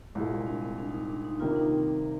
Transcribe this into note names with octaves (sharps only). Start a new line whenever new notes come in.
C2 A#2 G#3
D4
C4
D4
D#4
D4
D4
D#4
C3 D#3 G3 A#3 F4
D#4
C4
C4